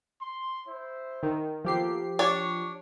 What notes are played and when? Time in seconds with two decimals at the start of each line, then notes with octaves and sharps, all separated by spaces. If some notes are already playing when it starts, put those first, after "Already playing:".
0.22 C6
0.67 E4 C5
1.23 D#3
1.65 F3 A#3 B3 G4 A4 C7
2.19 D4 C#5 C#6